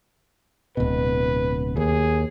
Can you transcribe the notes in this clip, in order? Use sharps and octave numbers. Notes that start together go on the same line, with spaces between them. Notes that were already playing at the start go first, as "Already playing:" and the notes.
D1 B2 B4
D#2 G#4